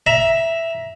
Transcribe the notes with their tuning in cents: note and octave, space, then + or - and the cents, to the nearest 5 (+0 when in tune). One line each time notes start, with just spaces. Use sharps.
E5 +0 A#5 +25